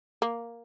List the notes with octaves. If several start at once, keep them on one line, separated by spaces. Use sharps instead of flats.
A#3